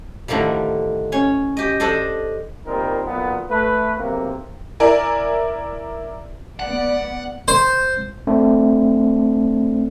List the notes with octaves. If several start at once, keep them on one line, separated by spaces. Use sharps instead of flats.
A2 D3 D#3 F3 G3
C#4 C#5
G4 D#5
D4 A4 C5 D#5
A#2 G3 C4 D#4 A#4
B1 A#2 B3
A3 B4
B1 C3 A#3
E4 A#4 D5 G#5
B3 D5 F#5
C5
A3 C4 D4